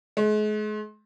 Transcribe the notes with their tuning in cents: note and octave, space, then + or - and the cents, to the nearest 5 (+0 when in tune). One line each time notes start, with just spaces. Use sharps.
G#3 +40